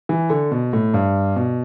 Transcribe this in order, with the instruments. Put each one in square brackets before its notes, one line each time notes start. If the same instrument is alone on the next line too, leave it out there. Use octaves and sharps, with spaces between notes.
[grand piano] E3
D3
B2
A2
G2
B2